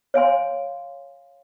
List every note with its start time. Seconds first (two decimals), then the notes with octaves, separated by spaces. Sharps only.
0.14 C#5 F5 G#5 C6